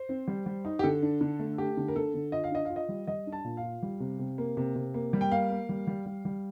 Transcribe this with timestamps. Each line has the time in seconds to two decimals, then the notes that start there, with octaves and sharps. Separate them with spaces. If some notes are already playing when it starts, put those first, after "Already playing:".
Already playing: C5
0.09 C4
0.28 G3
0.46 G3
0.65 D#4
0.79 G4
0.83 D3 A4
1.02 D4
1.21 D3
1.40 A3
1.58 A3 G4
1.77 D3
1.88 A#4
1.95 D3 A4
2.14 D3
2.32 F4 D#5
2.44 F5
2.51 D4 D#5
2.65 F4 F5
2.76 D#5
2.89 G3
3.07 G3 D#5
3.27 D4
3.32 A5
3.45 A#2
3.57 F5
3.63 F4
3.83 G3
4.00 C3
4.19 C3
4.38 A#3
4.57 C3
4.76 C3
4.94 A#3
5.13 G3
5.21 G5
5.31 A#3 F5
5.50 A#3
5.69 G3
5.87 G3
6.06 G3
6.25 G3